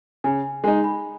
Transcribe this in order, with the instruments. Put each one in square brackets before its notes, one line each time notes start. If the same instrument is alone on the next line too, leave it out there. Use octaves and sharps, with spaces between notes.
[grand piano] C#3 [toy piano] G#5
[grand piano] G#3 [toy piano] G#5
[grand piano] D#4
[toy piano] B5